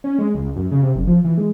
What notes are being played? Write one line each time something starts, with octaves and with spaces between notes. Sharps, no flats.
C#4
G#3
C#2
F#2
C#3
C3
F#1
F3
E3
G#3